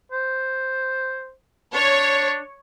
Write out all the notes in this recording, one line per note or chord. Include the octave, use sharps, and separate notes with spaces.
C5
D4 C#5